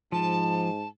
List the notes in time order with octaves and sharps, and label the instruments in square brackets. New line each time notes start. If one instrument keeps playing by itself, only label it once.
[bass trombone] G#2 [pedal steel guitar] F3 [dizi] A5